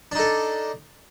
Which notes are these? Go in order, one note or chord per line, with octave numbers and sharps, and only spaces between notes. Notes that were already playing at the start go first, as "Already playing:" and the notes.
D4 D#4 A4